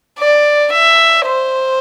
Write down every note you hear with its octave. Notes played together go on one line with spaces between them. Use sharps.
D5
E5
C5